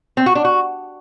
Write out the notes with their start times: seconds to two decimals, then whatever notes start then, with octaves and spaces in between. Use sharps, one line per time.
0.17 C4
0.26 F#4
0.35 D4
0.45 F#4